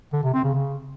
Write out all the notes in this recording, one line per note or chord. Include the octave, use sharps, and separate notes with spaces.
D3
C3
C4
C#3
C#3